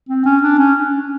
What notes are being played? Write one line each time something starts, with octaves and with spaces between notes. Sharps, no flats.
C4
C#4
D4
C#4